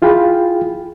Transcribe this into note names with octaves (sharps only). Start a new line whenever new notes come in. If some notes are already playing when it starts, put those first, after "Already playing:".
E4 F4 G#4 G5 B5